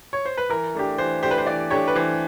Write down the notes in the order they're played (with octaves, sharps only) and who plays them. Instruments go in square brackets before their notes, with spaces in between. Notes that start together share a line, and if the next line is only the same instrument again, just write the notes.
[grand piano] C#5
C5
B4
[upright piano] E3 [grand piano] A#4
[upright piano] A3 D4 G4
[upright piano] E3 [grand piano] C5
[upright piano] A3 D4 G4 [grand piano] C5
[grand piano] B4
C5
[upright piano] E3 [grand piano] D5
[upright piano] A3 D4 G4 [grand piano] C#5
[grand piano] B4
[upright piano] E3 [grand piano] C5